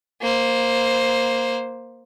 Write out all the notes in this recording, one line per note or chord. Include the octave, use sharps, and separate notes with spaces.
A#3 C5